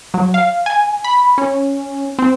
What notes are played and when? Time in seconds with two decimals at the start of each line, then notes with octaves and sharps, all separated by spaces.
0.14 F#3
0.34 F5
0.66 G#5
1.04 B5
1.38 C#4
2.19 C4